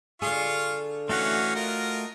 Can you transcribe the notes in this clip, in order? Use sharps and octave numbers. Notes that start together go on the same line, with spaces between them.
D3 F4 G#4 F5 C#6
E3 A3 C#4 F#4 F5 F#5
F4 A#4 D#5